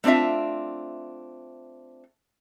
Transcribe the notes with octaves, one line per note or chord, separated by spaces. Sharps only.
A3 C4 D4 F4 E5